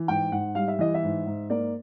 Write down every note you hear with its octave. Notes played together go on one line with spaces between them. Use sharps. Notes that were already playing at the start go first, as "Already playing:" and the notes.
Already playing: E3
G#2 G5
G#2 F#5
G3 F5
E5
E3 D#5
E5
G#2
G#2
A#3 D5